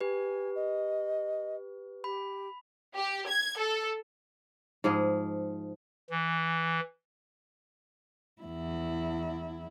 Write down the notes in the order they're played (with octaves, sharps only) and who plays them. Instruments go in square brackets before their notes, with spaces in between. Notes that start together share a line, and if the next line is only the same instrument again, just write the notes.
[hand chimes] G4 B4 [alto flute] G#5
[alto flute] D#5
[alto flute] G4 [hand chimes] B5
[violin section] G4
G#6
A4
[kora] G#2 F3 G#4
[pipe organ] E3
[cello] E2 E4